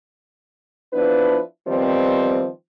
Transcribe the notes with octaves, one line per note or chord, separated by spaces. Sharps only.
F3 B3 D4 E4 B4
D#3 F3 G3 B3 C4